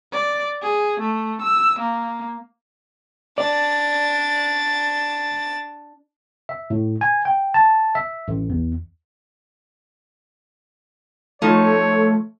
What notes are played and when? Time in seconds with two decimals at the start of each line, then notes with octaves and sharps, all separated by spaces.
0.12 D5
0.63 G#4
1.00 A3
1.42 E6
1.79 A#3
3.38 D4 D5 A6
6.49 E5
6.70 A2
7.01 G#5
7.25 G5
7.54 A5
7.95 E5
8.28 A1
8.50 E2
11.42 F3 A3 D#4 C#5